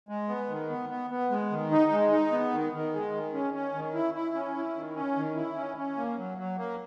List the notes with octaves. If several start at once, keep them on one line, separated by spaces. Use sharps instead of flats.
G#3
B3
D#3
B3
B3
B3
G#3
D#3
D#4
G#3
D#4
B3
D#3
D#3
G#3
D#3
C#4
C#4
D#3
E4
E4
C#4
E4
D#3
C#4
D#3
E4
C#4
C#4
A#3
F#3
F#3
A#3